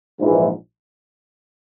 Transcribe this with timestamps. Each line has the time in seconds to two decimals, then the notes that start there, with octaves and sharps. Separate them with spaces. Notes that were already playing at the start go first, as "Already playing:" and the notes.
0.18 A#1 G#2 E3